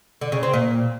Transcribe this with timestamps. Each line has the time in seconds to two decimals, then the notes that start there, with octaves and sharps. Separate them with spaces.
0.21 D3
0.32 C#3
0.43 C4
0.53 A#2